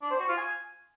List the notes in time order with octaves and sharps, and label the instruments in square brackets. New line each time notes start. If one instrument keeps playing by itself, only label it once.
[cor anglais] D4
C5
F#4
F4
G#5